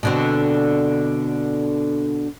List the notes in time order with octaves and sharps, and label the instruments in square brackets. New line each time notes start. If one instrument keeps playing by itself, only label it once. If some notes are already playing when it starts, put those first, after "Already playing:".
[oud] B2 D3 C4